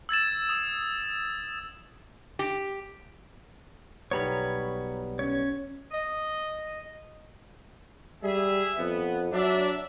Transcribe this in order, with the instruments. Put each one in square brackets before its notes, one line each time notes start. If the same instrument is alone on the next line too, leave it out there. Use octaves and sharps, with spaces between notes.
[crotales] E6 G#6 A6 E7
D#6
[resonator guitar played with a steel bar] G4
[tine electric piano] B1 G3 B3 [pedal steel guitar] C#5 A#5 B5
[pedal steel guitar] C#4 C#5
[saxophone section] D#5
[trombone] G3 [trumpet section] G#4 E5
[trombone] F2 [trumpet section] B3
[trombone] F#3 [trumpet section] D4 E5